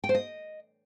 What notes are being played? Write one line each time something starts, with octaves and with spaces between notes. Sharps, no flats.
G5
C5
D#5